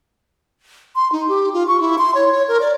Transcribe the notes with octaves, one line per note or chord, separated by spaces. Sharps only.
C6
D#4
G4
F4
C#6
E4
C6
C#5
C#5
A#4
D5